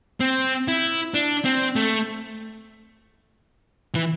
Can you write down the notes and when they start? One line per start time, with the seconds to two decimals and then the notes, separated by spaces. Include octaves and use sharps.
0.20 C4
0.68 E4
1.14 D4
1.45 C4
1.76 A3
3.95 E3